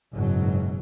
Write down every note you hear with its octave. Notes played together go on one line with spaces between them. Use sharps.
F#1 G#2 B2 F#3